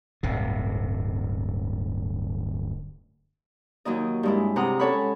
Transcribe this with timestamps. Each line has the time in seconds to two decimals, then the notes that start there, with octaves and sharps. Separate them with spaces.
0.23 D1 G1 C3
3.85 D#2 F#3 D#4 D#5
4.23 G2 G#3 E4
4.56 C3 F#5 A#5 D#6
4.79 C#4 A4 C#5 F#5 B5